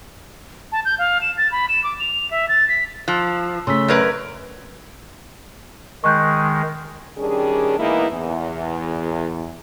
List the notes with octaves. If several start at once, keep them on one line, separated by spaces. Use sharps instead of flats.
A5
G6
F5
E7
A6
B5
E7
D6
F7
E5
A6
B6
F3 A5 E6 F#6
C#3 A3 C6 E6 B6
F#2 A#4 B4 D5 G#6 D7
D#3 G#3 C#6 F#6 G6
D#3 G3 C#4 D4 G#4
E3 G#3 A#3 B3 D#4 E4
E2